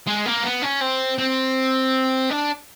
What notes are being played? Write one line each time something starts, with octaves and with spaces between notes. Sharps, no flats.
G#3
A#3
B3
C#4
C4
C4
D4